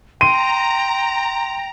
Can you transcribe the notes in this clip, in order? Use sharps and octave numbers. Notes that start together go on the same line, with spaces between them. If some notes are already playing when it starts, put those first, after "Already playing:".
G5 A#5 C6 D#7